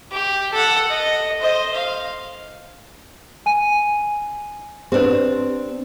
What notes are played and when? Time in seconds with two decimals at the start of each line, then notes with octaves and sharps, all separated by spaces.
0.11 G4
0.53 A4 F#5
0.90 D#5
1.40 C5 D#5
1.75 F5
3.46 G#5 D#7
4.92 C4 D4 G4 B4